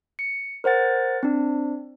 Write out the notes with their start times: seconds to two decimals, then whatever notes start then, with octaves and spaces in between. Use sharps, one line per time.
0.19 C#7
0.64 A#4 C5 F#5 A6
1.23 C4 D4